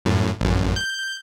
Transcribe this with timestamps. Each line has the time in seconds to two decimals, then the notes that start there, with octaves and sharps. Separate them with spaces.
0.05 F#2 A2
0.41 A1 F#2
0.76 G6